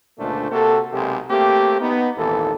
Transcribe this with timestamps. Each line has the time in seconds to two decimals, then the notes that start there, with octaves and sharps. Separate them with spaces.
0.19 C#2 A#2 D3 A3 D4 C5
0.51 C3 A#3 F#4 A4
0.93 B1 C3 G#3 A#3 G4
1.30 A3 A#3 C4 G4
1.81 B3 D#4
2.17 G#1 D#2 A#2 E3 A#3 A4